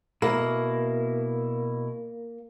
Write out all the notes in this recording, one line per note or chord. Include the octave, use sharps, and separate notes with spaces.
B2 A#3 E4